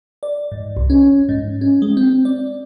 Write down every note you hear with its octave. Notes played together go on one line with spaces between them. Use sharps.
D5
G#2
C2
C#4
G#2
C#4
G#3
C4
D5